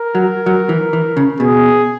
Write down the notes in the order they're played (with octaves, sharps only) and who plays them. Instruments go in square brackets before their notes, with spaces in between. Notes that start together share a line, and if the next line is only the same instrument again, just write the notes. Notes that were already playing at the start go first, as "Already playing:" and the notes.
Already playing: [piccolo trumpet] A#4
[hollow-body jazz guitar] F#3
F#3
E3
E3
C#3
[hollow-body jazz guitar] B2 [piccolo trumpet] G#4